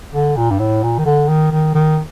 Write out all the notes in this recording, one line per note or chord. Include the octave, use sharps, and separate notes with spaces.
D3
A#2
G2
A2
A#2
D#3
D3
D#3
D#3
D#3